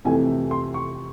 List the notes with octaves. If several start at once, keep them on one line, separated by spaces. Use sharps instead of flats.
F2 C3 E3 A3 G#5
C6
C#6